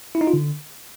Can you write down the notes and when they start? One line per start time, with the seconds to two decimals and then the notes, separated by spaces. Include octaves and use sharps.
0.15 E4
0.21 D#4
0.27 F4
0.34 D3